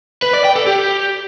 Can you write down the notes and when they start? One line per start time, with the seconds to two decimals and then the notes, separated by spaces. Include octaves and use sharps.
0.22 B4
0.33 D5
0.44 G5
0.56 A4
0.67 G4